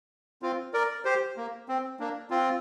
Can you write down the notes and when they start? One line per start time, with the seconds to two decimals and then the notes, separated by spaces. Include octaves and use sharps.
0.42 C4 F4
0.74 A#4 D5
1.05 G4 C5
1.37 A#3
1.69 C4
2.00 A#3 D4
2.30 C4 F4